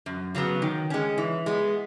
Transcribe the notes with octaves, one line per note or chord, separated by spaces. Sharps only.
F#2
C#3 F#3 B3
D#3
G#3 C#4
E3
G#3 B3